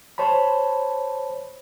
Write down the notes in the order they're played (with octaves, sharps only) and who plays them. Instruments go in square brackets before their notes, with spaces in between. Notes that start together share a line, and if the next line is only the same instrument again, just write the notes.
[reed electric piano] C5 C#5 A5 B5